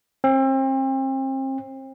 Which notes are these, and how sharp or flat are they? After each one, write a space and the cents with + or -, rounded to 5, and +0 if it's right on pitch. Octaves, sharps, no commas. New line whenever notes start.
C4 +35